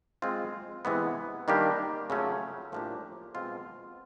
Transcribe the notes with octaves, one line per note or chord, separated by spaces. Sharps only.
G#3 C4 F4
C3 E3 G#3 B3
D#3 G3 A#3 D4 G4
C#3 F#3 A3 C#4 F4
A2 F3 A#3 D4 G4
B2 G#3 C4 F4